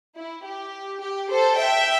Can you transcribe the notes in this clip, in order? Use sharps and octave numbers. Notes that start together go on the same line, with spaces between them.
E4
G4
G4
A4 C5
E5 G5